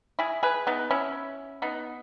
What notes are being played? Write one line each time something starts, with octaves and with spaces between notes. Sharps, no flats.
E4 G#4
G#4 B4
B3 D#4
C#4 E4
B3 D#4